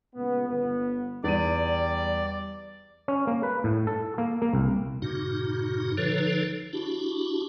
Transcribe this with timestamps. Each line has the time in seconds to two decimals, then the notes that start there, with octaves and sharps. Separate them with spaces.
0.15 C#2 A#2 B3
0.48 G1 B3
1.24 E2 G3 D5 D#7
3.08 C#4
3.27 A#3
3.43 B4
3.64 A2
3.87 A4
4.18 A#3
4.42 A#3
4.53 C2
5.02 G2 A#2 C#3 D#4 F#4
5.97 D3 F3 D#4 A4 B4 C#5
6.73 D4 E4 F#4 G4